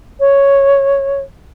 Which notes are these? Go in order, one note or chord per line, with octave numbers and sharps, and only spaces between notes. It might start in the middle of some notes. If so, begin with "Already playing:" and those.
C#5